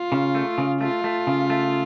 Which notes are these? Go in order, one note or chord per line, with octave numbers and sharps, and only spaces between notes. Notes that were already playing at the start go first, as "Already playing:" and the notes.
Already playing: F4
C#3
A3
C#3
A3 F4
A3
C#3
A3